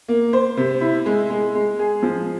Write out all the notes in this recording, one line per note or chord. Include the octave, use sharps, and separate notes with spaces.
A#3
C5
C3
E4
G#3
G#3
G#3
G#4
F3